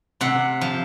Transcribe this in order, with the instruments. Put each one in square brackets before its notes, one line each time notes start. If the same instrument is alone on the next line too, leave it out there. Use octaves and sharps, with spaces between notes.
[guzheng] C3 F#5
F3